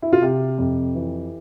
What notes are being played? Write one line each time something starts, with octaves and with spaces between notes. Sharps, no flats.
E4
F4
C3 G4
F2
E3